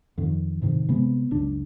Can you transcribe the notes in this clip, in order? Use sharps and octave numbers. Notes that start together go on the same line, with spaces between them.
F2 D#3
A2 C3 D#3
C3 G#3 A3 B3
F#1 C#2 D4